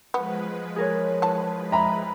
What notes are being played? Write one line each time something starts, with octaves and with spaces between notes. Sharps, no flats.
F3 G#3 B3 B4
G#4 A#4 C#5
E3 A5
E5 A#5 B5